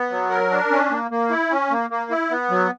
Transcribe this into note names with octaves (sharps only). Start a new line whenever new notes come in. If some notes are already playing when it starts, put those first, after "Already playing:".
Already playing: B3
F#3
A#4
D4
C#4
A#3
A#3
E4
C#4
A#3
A#3
E4
B3
F#3